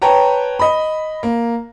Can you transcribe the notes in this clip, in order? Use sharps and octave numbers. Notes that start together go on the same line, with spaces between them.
B4 C#5 G5 A5 A#5
D#5 B5
A#3